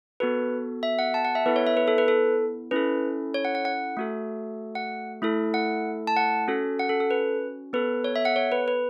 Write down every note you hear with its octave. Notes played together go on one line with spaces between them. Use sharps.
B3 F#4 A4 B4
E5
F#5
A5
F#5
E5
B3 E4 A4 B4
C#5
E5
B4
A4
B4
A4
C#4 E4 A4 B4
C#5
F#5
F#5
F#5
A3 F#4 A4
F#5
A3 E4 A4
F#5
A5
F#5
C#4 F#4 A4
F#5
A4
A4
B4
B3 A4 B4
C#5
E5
F#5
C#5
B4
B4